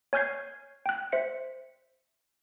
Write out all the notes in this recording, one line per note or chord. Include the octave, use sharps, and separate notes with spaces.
C#5 G#5 F6 G6 G#6 C7
G5 F#6
C5 E5 C#7